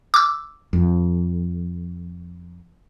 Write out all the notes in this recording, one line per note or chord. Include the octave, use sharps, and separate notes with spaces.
D6 E6
F2